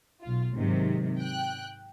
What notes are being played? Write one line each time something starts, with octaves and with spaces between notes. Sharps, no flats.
B1 F4
G#2 C3 D#3 F#3
G5 F#6